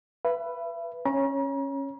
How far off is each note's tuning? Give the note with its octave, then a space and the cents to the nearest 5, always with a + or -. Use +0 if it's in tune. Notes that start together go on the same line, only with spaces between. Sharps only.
B4 +0 E5 +35
C#4 -15 C#5 +0 A#5 +40